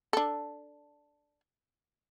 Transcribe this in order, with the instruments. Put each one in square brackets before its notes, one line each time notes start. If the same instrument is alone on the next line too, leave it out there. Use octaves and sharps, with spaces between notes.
[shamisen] D4 A4